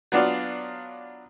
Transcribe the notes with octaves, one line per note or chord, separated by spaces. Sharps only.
F#3 B3 D4 F4 D5 F5